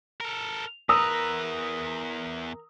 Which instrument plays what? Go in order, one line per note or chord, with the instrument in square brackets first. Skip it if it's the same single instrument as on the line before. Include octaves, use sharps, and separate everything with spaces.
[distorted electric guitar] A4 A#4
[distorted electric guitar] E2 B4 [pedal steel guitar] A#4 A#5 [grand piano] D#6 E6